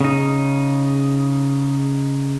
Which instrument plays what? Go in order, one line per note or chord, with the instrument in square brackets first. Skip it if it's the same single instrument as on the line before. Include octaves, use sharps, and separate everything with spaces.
[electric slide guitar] C#3 D#4